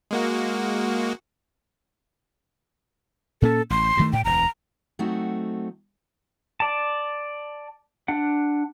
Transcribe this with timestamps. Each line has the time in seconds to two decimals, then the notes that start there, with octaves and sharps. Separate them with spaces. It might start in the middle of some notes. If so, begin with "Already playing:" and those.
0.11 G#3 A#3 F#4
3.42 A#2 A#3 C#4 A4
3.70 A1 C6
3.97 G2 D#3 A3
4.13 A2 G5
4.25 E1 D2 A#5
4.99 F#3 A3 C4 D#4 F#4
6.60 D5 A5
8.08 D4 F#5